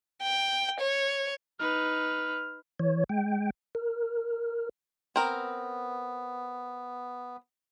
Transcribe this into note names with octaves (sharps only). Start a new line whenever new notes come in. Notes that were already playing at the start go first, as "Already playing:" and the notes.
G5
C#5
D#4 B4 F6
E3 C#5
G#3 G5
A#4
B3 C4 A#4